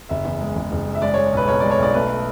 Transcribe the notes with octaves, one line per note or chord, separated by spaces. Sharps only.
F#1 E5
E2
G#3
F#1
F#1
G#3
E5
G#3 D5
C#5
G#3
C#5
B1 B4
B1 C#5
G#3 D5
C#5
B1 D5
A3 B4